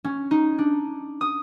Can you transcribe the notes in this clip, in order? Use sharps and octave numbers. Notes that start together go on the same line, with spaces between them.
C#4
D#4
D4
D#6